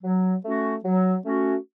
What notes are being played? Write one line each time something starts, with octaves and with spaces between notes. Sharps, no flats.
F#3
A3 C#4 F#4
F#3
A3 C#4 F#4